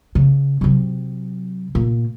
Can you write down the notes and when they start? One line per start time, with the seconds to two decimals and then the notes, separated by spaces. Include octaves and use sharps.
0.15 C#3
0.61 C3 F#3
1.75 A#2